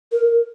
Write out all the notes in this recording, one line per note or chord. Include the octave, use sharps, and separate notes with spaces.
A#4